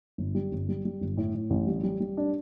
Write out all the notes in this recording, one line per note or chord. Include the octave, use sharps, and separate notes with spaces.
G1
G3
G1
G3
G3
G1
A2
A2
A1
G3
G3
G3
D4